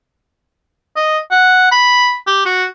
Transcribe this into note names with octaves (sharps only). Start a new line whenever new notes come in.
D#5
F#5
B5
G4
F#4